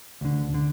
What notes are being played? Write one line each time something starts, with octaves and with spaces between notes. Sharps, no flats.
D2 D3
D3